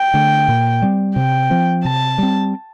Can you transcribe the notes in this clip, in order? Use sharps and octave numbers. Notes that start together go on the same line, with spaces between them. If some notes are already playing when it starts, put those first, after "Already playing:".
Already playing: G5
D3 A3
A#2
G3 C4
C3 G5
F3 C4
C3 A5
G3 C4